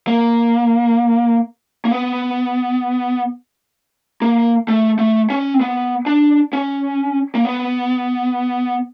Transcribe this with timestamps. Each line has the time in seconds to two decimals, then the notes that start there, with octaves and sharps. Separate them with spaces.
0.07 A#3
1.85 A#3
1.91 B3
4.22 A#3
4.68 A3
4.99 A3
5.30 C#4
5.54 C4
5.61 B3
6.06 D4
6.53 C#4
7.35 A#3
7.45 B3